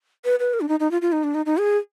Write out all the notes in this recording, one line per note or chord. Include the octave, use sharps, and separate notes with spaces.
B4
B4
A#4
D4
D#4
D#4
F4
F4
D#4
D4
D#4
D#4
G#4